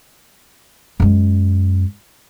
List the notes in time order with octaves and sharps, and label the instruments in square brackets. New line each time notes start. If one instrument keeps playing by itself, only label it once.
[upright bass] F#2 G#3